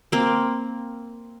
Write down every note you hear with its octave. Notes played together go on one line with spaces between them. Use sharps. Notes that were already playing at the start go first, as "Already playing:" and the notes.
A#3 C4